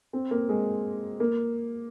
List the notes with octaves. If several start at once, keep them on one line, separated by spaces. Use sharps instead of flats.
C4
A#3
G#3
A#3